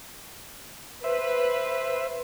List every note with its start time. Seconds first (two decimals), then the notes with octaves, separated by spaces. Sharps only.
1.04 B4 C5 E5